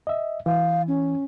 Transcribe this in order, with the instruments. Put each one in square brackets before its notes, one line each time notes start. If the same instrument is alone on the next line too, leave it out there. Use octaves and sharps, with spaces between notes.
[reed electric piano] D#5 E5
[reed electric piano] E3 [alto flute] F5
[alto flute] C#4